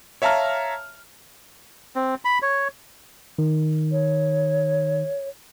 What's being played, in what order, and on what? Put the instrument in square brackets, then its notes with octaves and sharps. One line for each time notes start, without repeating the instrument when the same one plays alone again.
[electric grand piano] C#5 E5 F5 A5 A#5 F6
[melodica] C4
B5
C#5
[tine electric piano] D#3
[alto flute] C#5